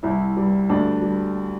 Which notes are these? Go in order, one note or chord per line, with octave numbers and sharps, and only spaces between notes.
C2 E4
G3
D2 D4
G3